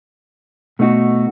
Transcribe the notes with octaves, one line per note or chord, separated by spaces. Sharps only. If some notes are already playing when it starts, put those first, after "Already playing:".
B2 A3 D#4 F#4